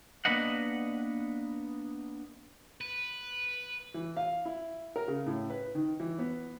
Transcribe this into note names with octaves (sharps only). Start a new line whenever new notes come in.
A#3 B3 D4 B4 D#5 F#5
B4
E3
F5
E4
A#4
C#3
A2
B4
D#3
E3
B3